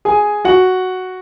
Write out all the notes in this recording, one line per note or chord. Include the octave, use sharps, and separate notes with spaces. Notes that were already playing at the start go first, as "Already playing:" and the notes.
G#4 G#5
F#4 F#5